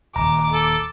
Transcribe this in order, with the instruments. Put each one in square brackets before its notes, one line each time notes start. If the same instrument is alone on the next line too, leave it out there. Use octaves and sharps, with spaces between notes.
[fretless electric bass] D#1 D#2 [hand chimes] A#5 [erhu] D6
[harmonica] A4